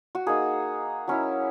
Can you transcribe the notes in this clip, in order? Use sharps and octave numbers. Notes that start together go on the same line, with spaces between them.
F#4
A#3 D#4 G#4
F#3 C#4 E4